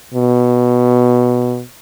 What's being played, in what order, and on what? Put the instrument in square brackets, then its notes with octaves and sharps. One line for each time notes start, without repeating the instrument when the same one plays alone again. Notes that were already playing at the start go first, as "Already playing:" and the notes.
[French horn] B2